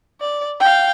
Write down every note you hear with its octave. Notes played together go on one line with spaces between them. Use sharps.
D5
F5 G5